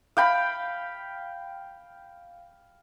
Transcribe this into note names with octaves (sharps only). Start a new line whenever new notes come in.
F5 G5 B5